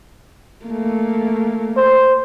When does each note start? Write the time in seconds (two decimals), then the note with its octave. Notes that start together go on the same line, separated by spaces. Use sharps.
0.65 A3 A#3
1.77 C5